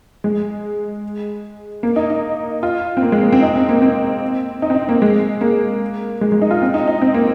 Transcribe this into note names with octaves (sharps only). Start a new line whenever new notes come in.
G#3
A#3
D#4
D#4
F4
C4
A#3
G#3
A#3
C4
D#4
C4
A#3
C4
D#4
C4
D#4
A#3
G#3
A#3
G#3
G#3
D#4
F4
C4
D#4
D#4
C4
A#3